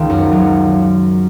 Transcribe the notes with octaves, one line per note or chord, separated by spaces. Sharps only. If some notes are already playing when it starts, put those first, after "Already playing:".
Already playing: C#2 D#3
F#2
F#3